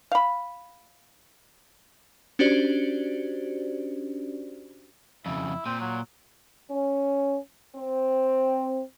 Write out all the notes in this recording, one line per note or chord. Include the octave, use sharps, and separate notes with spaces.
F5 B5
C#4 D4 F#4 G4 C5 D5
F2 C#3 E4
A#2 C4
F#3
C#4
C4